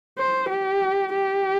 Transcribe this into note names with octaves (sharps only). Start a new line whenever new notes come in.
C5
G4
G4